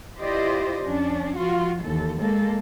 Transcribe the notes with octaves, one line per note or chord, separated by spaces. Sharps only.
E4 F4 G4 C5 D5 D#5
F2 C#4 D4
F3 F4 F#4
D#2 E3 A4
G#3 A#3 A4